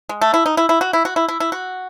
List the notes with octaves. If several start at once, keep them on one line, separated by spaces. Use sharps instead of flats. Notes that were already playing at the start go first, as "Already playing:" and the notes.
G#3
A3
E4
D#4
E4
E4
F#4
E4
F#4
E4
E4
E4
F#4